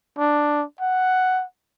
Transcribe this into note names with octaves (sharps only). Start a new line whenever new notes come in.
D4
F#5